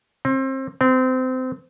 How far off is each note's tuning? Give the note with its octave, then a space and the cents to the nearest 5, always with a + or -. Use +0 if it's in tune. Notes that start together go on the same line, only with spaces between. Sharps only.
C4 +30
C4 -25